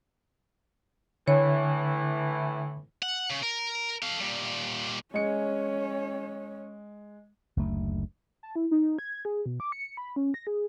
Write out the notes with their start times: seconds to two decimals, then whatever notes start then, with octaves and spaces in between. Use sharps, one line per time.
1.28 A2 D3 E3 C#5
3.02 F#5
3.30 C#3
3.43 A#4
4.02 A4 F5
4.21 A#2 G3
5.14 G#3 C#4 C#5 C#7
7.57 F#1 D2 A3
8.43 A5
8.56 E4
8.71 D#4
8.99 G#6
9.25 G#4
9.46 B2
9.60 D6
9.72 C#7
9.97 B5
10.16 C#4
10.34 A#6
10.47 G#4